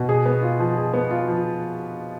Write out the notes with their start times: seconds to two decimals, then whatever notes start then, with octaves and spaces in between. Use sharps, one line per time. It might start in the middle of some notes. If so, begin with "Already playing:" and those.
Already playing: B2
0.09 G#4
0.25 B3
0.43 F4
0.60 F3
0.77 G#4
0.93 B3
1.11 F4
1.28 F3